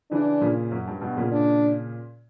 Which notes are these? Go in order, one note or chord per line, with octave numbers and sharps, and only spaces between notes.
C#3 E3 D4
A#2 C#3
F#2
G2
G2 B2
A#2 C#3
D4